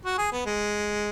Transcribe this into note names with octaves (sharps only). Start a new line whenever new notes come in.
F#4
G#4
B3
G#3